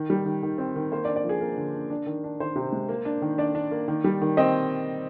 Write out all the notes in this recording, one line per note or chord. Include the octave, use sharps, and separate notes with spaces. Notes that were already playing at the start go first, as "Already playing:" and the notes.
Already playing: D#3
G3
D#3
D#3
C4
D#3
A#3 C5
D5
D4
D5
F3
G#4
A#3 A#4
D3
D4
D4
D#3
D4
D#3 C5
C3
G#3
A#3
D4
D#3
D4 D5
D4
A#3
D#3
G3
D#3
C4 D#5